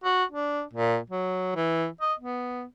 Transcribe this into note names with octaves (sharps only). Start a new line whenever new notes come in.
F#4
D4
A#2
F#3
E3
D#5
B3